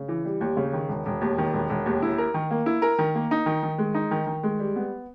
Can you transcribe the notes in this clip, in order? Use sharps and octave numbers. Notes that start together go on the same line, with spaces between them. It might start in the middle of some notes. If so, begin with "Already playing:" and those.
Already playing: C#3
E3
G3
D#2
C#3
D#3
E1
E1
D#2
D#3
E1
E1
D#2
E4
A#4
D#3
A#3
E4
A#4
D#3
A#3
D#4
D#3
D#3
G#3
D#4
D#3
D#3
G#3
G3
B3